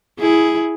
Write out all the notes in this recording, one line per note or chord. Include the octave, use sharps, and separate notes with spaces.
E4 G#4